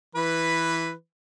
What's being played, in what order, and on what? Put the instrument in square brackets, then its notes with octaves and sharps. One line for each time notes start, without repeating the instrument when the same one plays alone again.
[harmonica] E3 B4